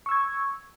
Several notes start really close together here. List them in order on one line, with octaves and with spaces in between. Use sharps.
C#6 E6 G#6